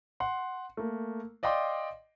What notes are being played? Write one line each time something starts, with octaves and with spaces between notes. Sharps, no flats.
F#5 C6
A3 A#3
D5 D#5 F5 G5 C6 D6